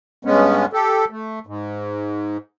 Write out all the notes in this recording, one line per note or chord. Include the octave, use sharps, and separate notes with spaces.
G2 G#3 B3 C#4
G4 A4
A3
G#2